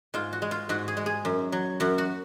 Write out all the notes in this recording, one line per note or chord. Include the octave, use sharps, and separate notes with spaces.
G#2 F4
F#4
G#3
F4
G#2 F#4
G#4
G#3
G#4
F#2
F#3
F#2 F#4
F#4